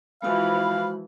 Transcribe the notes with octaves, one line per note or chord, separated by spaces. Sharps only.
E3 F3 G#3 F#4 F5 B5